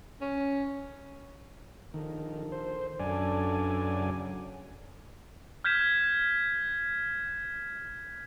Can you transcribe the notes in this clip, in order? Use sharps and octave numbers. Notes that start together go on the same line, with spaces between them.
C#4
A#1 D#3 A#3 A4
C5
F#2 D4 A4 D5 G#5
C#3 F#3
F6 G6 G#6 B6 E7